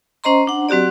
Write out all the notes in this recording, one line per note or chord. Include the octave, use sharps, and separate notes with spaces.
C#4 C5 D#5 A#5 C6
D4 F#5
F#3 C4 F#4 G4 D5